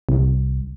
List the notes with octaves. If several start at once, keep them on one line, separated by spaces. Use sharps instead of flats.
C2